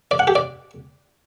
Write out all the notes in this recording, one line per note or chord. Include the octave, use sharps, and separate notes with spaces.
D5
F#5
G4
D5